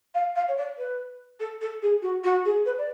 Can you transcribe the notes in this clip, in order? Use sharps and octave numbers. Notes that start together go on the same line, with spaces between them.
F5
F5
C#5
D5
B4
A4
A4
G#4
F#4
F#4
G#4
B4
D5